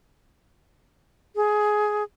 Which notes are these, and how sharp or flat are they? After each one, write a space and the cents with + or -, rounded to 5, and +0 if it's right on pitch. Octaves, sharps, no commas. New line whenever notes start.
G#4 +15